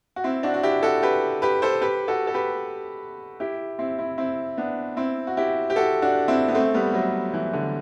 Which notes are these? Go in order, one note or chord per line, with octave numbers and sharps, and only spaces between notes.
F#4
C4 E4
D4 F#4
F#4
E4 G4
F#4 A4
G4 B4
G4 B4
A4 C5
G4 B4
F#4 A4
A4
G4 B4
E4 G4
C4 E4
C4 E4
C4 E4
B3 D4
C4 E4
F#4
E4 G4
G4
F#4 A4
D4 F#4
C4 E4
B3
A3 C4
G3 B3
F#3 A3
E3
D3